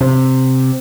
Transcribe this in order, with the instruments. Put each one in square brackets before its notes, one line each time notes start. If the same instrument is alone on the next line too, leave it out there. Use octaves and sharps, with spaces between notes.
[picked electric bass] C3